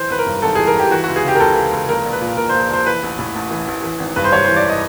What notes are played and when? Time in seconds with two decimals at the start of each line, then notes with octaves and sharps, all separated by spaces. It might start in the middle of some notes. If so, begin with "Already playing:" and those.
Already playing: E3 C5
0.10 G#1 B4
0.19 A#4
0.27 G2
0.42 G#1 A4
0.55 E3 G#4
0.67 A#4
0.75 G#1 G4
0.91 E3 F#4
1.04 C#2 F#4
1.16 G#4
1.24 C#3 G4
1.35 A#4
1.40 C#2 A4
1.56 E3
1.72 C#2
1.89 A#1 A#4
2.06 A#1
2.13 B4
2.22 A#2
2.37 A#2 A#4
2.49 A#1 C5
2.70 A#1 C5
2.86 E3 B4
3.03 A1
3.19 A2
3.36 A1
3.51 E3
3.68 A1
3.83 E3
4.00 G#1
4.16 G2 B4
4.24 C5
4.32 G#1 C#5
4.44 E3 C5
4.57 D5
4.70 D#5